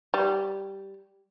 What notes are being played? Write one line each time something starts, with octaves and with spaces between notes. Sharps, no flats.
G3